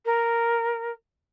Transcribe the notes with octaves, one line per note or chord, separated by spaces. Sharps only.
A#4